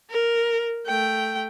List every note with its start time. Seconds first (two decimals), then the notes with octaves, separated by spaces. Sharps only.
0.10 A#4
0.86 A3 G5